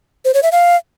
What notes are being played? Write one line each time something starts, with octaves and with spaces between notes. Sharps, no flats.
C5
C#5
E5
F5